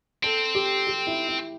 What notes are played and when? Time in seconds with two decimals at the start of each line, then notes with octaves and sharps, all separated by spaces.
0.23 C4 A4
0.55 G4
0.87 G4
1.07 E4
1.28 E4